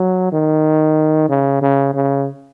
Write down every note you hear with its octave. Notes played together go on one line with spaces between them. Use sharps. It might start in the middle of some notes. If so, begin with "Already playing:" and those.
Already playing: F#3
D#3
C#3
C#3
C#3